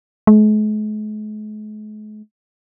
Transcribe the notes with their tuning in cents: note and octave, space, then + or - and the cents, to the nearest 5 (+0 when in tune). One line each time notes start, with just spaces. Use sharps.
G#3 +45